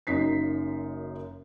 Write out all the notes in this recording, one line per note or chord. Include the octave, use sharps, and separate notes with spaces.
F#1 F#2 D#4 B6 C7